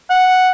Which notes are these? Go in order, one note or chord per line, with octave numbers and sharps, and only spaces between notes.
F#5